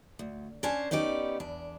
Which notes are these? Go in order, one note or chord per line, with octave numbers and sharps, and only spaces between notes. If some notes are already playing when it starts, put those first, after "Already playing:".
D2
C#4 D4 C5 G#5 A5
B3 C#4 D#4 G4 D5
E2 D4